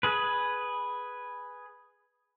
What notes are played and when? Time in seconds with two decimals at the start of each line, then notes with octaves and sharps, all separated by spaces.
0.03 G#4 B4